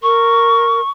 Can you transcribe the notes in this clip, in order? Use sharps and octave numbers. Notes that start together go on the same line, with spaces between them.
A#4 C#6